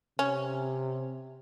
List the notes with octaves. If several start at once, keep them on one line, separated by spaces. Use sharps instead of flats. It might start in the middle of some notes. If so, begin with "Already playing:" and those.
C3 C#4